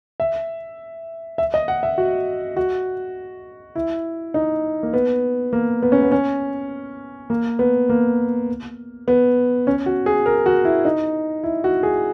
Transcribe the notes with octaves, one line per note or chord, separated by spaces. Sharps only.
E5
E5
D#5
F#5
E5
F#4
F#4
E4
D#4
A#3
B3
A#3
B3
C#4
B3
C#4
A#3
B3
A#3
B3
C#4
F#4
G#4
A#4
F#4
E4
D#4
E4
F#4
G#4